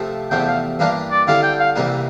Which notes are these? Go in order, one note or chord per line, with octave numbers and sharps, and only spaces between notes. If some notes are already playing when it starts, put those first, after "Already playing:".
Already playing: C3 F3 A3
E2 C3 F3 A3 G5
F5
G2 E3 A#3 D4 G4 F5
D5
D3 G3 C4 E4 A4 F5
G5
F5
C2 C3 E3 G3 A#3